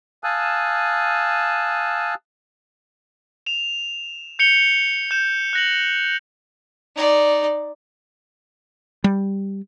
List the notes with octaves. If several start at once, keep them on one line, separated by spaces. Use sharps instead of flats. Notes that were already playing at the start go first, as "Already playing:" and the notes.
F5 G#5 A5 D#6 E6 F#6
E7 F7
G6 C#7 F7 G7
G6 E7
F#6 A#6 F#7
D#4 D5
G3